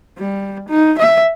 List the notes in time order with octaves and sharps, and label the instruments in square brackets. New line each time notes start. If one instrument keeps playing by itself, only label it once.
[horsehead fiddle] G3
D#4
E5